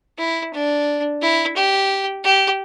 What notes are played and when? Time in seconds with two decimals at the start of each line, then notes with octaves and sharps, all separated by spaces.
0.18 E4
0.53 D4
1.22 E4
1.56 G4
2.24 G4